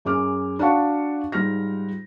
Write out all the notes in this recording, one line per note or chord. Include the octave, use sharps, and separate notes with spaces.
F#2 G#4 D6 F6
D4 F#4 F5 F#5 A5 C#6
G#2 G3 F4 F6 A#6